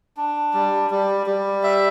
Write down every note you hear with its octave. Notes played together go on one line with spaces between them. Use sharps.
D4
G3
G3
G3
E5